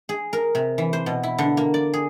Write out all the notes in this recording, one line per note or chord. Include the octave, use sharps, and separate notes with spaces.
G#4
A#4
C3
E3
C5
B2
E4
D3
A#3
D5
G#4